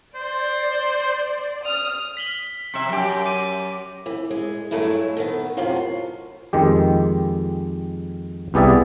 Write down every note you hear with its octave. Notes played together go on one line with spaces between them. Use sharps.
C5 D5
D#6 F6
B6 F#7 G7
C3 E5
F#2 G4
D6 D#7
E3
G#3
G2 F#3 G#3 A3 D4 E4
D#3 A3 B3
F#2 A2 C3 B3 F4 F#4
F2 D#3 G#3 G4
C2 B3 G4 G#4 D5 E5